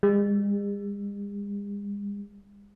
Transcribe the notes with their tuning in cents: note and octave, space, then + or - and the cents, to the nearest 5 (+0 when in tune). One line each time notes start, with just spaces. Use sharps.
G#3 -45